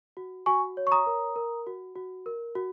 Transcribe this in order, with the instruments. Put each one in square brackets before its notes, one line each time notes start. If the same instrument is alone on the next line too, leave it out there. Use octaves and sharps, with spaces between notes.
[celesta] F#4
F#4 G#5 C#6
C#5
C#6
A#5 D#6
A#4
A#4
F#4
F#4
A#4
F#4